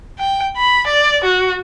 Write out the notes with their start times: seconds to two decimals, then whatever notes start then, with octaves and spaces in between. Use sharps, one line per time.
0.19 G5
0.57 B5
0.87 D5
1.24 F#4